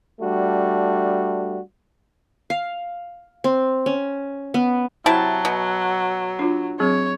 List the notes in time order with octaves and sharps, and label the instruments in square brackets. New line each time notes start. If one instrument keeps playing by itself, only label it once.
[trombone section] G3 A3 D4 F#4
[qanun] F5
C4
C#4
B3
[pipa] C3 E4 A5 [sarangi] F#3
[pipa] B2
[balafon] D4 F4
[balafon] F#3 C4 G#4 [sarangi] C#5